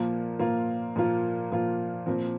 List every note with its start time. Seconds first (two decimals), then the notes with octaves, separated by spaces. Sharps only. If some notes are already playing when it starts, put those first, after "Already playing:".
Already playing: A#2 F3 A#3 F4
0.39 A#2 F3 A#3 F4
0.96 A#2 F3 A#3 F4
1.51 A#2 F3 A#3 F4
2.06 A#2 F3 C4